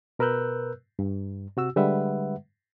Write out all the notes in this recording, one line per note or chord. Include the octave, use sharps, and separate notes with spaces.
B2 A#4 B4 E6 F#6 G6
G2
C3 F#4 E6
D3 G3 G#3 B4 E5 F#5